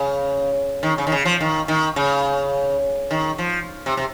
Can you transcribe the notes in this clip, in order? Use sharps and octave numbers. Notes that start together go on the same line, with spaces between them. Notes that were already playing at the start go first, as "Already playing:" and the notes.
Already playing: C#3
D#3
C#3
D#3
C#3
F3
D#3
D#3
C#3
D#3
F3
C3
C3